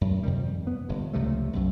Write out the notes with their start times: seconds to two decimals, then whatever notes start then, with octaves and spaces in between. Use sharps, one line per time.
0.01 F#2
0.23 F2 C3 D#3 G3
0.67 B3
0.89 G1 G2
1.13 C#2 C3 F3 A3
1.53 B1 F#2